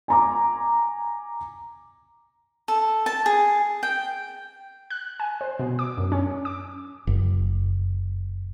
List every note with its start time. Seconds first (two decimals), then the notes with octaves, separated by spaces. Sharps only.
0.08 G#5 A#5 D6
2.68 A4
3.06 A5
3.26 G#4
3.83 G5
4.90 F#6
5.20 G#5
5.41 C5
5.59 B2
5.79 D6
5.98 F#2
6.12 C#4
6.45 D6
7.07 F#1